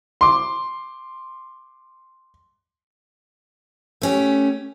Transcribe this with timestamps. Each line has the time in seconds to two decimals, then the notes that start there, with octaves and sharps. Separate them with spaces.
0.21 C6 D6
4.02 A3 C#4 G4